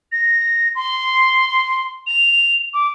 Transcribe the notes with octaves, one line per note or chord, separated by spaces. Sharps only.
A#6
C6
F7
D6